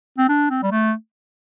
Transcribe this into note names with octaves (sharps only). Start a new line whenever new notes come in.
C4
D4
C4
G3
A3